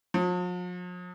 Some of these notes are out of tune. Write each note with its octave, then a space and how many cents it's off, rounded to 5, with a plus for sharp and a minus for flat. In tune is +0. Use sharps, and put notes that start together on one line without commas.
F3 +45